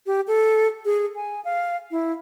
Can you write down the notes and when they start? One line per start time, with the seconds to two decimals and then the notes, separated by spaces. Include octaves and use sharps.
0.06 G4
0.27 A4
0.85 G#4
1.16 G#5
1.45 F5
1.91 E4